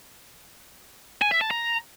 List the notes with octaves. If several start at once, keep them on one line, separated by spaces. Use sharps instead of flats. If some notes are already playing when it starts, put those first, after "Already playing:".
G#5
E5
A5
A#5